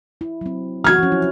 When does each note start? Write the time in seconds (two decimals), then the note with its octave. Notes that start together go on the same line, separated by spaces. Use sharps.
0.21 E4
0.41 F#3 C4
0.84 E3 F#3 F#4 F6 G#6
0.99 F3 C#4
1.12 E4